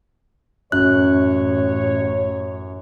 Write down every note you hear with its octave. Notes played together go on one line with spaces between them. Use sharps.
A1 F#2 C#5 F#6